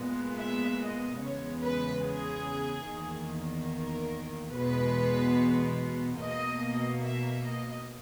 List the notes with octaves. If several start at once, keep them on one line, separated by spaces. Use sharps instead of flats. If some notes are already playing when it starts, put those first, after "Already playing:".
Already playing: A#2 G#3 B3
E5
D#5
E2 C#3 G#3 B3 C#5
B4
G#4
E2 D#3 A#3
A#4
E2 B2 G#3 B3 B4
B2 A#3 D#5
E5
D#5